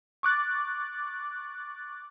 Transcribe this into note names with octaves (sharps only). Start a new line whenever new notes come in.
C#6 D6 F#6 A6